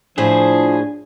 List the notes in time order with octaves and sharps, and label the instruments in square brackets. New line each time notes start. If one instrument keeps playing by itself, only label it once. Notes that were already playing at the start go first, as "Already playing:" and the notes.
[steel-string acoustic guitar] A2 E4 C5 [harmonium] F3 [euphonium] D4 [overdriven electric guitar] G#4